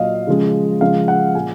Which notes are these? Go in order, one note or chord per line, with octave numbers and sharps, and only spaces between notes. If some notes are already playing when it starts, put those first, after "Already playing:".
Already playing: A#2 F#3 D#5 F5
C#3 F3 G#3
C#3 F3 G#3 F5
F#5
A#2 G#3 G#5